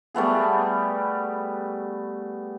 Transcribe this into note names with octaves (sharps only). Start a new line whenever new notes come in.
G3 A3 B3 G#4